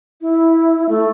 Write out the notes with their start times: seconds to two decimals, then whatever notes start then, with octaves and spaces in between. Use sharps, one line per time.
0.21 E4
0.89 A3